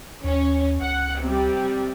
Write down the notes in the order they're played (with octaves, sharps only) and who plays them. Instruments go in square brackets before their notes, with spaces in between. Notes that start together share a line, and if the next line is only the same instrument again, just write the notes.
[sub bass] D#2 [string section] C#4
[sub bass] C#2 [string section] F#5
[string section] C3 G3